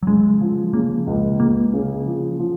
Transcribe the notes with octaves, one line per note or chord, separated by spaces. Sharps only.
F#3
C#3 G#3
F3
C#3 A#3
C#2
C#2 A#3
C#3
F3
F3